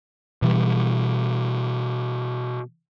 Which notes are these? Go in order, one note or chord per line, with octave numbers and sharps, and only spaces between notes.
B2 E3 G3